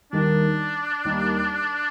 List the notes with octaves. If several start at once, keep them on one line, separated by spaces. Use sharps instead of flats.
D#2 D#3 G3 A#3 D4 D#4
D#2 D#3 G3 A#3 D#4